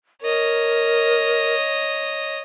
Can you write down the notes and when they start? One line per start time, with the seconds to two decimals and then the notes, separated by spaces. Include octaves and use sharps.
0.23 A#4 C#5 D#5